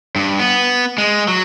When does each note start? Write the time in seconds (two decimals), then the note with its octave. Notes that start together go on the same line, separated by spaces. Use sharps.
0.16 G2
0.39 B3
0.98 G#3
1.28 F#3